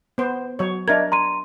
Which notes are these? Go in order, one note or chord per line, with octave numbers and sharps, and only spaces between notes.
B3 C5
F#3 C#5
D4 A#4 D#5 E5 G#6
A#5 C6 D#7